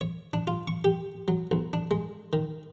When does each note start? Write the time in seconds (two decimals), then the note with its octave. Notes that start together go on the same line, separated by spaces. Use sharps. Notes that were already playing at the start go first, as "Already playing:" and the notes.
0.01 C#5
0.33 D4
0.47 F4
0.68 C#6
0.84 G4
1.28 F#3
1.51 B1
1.73 D4
1.91 G#3
2.33 D#3